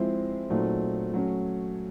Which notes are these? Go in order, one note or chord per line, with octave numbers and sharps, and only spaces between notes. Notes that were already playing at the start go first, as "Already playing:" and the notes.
Already playing: F3 G#3 C4 E4
A#2 F#3 A3 C4 D#4
F#3 A3 C#4